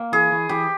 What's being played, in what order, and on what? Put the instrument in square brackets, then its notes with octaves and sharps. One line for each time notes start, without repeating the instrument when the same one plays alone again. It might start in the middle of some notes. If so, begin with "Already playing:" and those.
Already playing: [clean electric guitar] A#3
[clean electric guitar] E3 [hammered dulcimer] G#4
[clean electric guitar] E3
[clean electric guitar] E3 [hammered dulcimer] G4